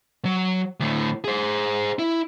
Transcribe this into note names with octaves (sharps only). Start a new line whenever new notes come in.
F#3
D2 A2
G#4 C5
E4